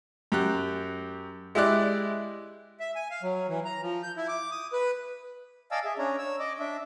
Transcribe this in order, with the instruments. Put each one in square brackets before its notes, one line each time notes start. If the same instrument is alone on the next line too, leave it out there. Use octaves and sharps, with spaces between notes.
[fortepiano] F#2 G4 F#6
G#3 E4 G4 D5 F#6
[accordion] E5
G#5
F5
F#3
E3
A#5
F3
G6
E4
D6
D#6
B4
[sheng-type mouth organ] D5 D#5 F5 G#5 A5 E6
G#4 E5
C#4 D4 C#5 A#5
C#5 E6
D5 D#5 D6
D4 E5